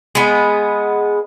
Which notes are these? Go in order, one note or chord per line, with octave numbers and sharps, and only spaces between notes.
G#3 B3